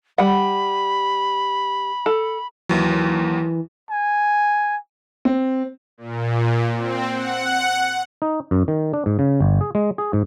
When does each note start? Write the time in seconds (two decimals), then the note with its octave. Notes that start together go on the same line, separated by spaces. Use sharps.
0.18 G3 F#5 B5
2.06 A4
2.69 D#2 E3 F#3
3.90 G#5
5.25 C4
5.98 A#2
6.77 C4
7.13 F#5
8.22 D#4
8.51 F#2
8.68 D#3
8.93 D4
9.06 G#2
9.19 C#3
9.40 G1
9.61 G#4
9.75 G#3
9.98 G#4
10.13 G#2